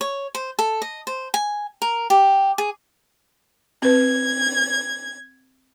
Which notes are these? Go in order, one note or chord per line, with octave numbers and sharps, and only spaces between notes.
C#5
C5
A4
D#5
C5
G#5
A#4
G4
G#4
C4 B4 G#6